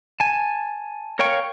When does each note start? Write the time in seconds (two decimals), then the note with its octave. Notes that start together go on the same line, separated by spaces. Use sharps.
0.20 G#5 A5
1.19 A#4 C#5 F5 G5 C#6